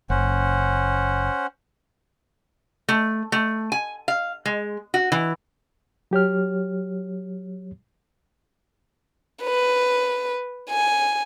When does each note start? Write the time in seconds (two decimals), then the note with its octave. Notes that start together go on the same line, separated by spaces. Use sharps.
0.10 F#1 C#4 C5 F#5
2.89 A3
3.32 A3
3.72 G#5
4.08 F5
4.46 G#3
4.94 F#4
5.12 E3
6.11 F#3 G4 C#5 F6
9.43 B4
10.70 G#5